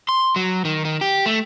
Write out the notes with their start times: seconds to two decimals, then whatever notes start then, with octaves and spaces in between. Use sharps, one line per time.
0.09 C6
0.36 F#3
0.65 D#3
0.85 D#3
1.01 G4
1.26 A3